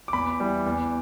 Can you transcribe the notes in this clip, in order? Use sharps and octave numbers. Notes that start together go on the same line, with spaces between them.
D6
E2 B5
E3 G3
E2